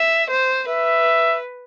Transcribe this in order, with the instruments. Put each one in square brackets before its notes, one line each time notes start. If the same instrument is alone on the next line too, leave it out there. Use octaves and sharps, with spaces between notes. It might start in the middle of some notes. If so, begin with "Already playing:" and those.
Already playing: [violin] E5
C5
[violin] B4 [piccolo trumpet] E5